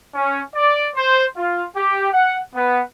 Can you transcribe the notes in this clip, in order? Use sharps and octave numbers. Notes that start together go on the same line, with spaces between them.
C#4
D5
C5
F4
G4
F#5
B3